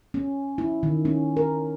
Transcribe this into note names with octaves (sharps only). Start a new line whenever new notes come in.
C#4
E4
D#3
C#4
A#4